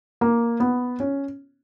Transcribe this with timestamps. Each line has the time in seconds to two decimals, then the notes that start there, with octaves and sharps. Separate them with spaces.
0.21 A#3
0.60 B3
1.00 C#4